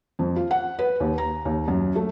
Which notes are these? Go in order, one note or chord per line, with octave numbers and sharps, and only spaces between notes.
F2
F4
F#5
B4
D#2
A#5
D#2
F#2
A3